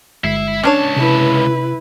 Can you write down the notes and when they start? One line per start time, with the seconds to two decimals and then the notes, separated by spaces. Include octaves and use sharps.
0.24 G1 G#3 E4 E5 C7
0.63 C#2 C#4 D4 C#5 A5 D6
0.97 C3 E4 B4